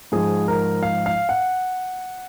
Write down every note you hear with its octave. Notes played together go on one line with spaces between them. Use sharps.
G#2 F3 G#4
A#4
F5
F5
F#5